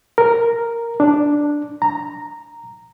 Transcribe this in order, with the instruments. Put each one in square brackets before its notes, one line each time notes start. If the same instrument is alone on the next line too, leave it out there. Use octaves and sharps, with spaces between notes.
[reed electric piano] A#4
D4
A#5